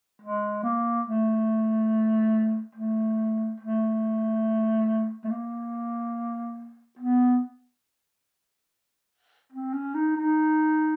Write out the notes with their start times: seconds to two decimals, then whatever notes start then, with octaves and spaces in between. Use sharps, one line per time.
0.21 G#3
0.64 A#3
1.07 A3
2.75 A3
3.60 A3
5.24 A3
5.30 A#3
6.99 B3
9.52 C4
9.74 C#4
9.95 D#4
10.17 D#4